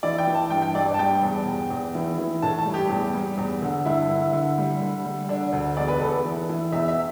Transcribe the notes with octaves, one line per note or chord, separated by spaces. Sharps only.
E3 D5
G5
E3
A5
G2 G5
G5
G2 D5
D5
A5
G3 G5
E2
E2
E2
E3
E3
A2 A5
A5
G3
G4
E2
G3
E2
D3
G2 E4
D3
D3
G3
D3
G3
D3 D4
D2
E2 D5
B4
E2 A4
E3
E3
E2 E5
E5